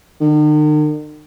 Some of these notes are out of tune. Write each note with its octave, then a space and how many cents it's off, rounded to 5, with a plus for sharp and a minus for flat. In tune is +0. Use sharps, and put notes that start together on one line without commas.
D#3 -45